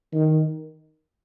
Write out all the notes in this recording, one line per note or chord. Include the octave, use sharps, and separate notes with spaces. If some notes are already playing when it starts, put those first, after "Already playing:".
D#3